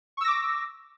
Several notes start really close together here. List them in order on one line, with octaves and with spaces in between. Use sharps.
C#6 E6 A#6 D6